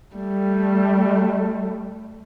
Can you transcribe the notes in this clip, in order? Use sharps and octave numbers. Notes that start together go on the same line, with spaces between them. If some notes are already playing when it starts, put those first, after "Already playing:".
G3 A3